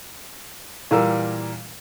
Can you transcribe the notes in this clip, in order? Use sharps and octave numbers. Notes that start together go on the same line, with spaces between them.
A#2 E3 G3 A#3 A#4 E6